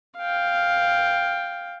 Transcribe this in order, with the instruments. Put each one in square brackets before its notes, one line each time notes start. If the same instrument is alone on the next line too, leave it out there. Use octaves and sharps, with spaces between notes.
[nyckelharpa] F5 G5